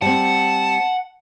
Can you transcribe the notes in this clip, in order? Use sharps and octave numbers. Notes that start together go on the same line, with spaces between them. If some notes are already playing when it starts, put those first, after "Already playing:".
G3 C4 F#5 A5